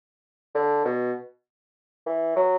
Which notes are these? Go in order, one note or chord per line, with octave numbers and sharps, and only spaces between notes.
D3
B2
E3
F#3